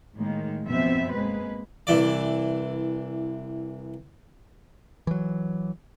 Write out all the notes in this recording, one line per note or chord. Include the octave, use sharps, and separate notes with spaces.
A2 D#3 G#3 A#3
F#2 B2 F3 B3 C4 E5
G#3 A#3 B4
C2 E3 D5
E3 F#3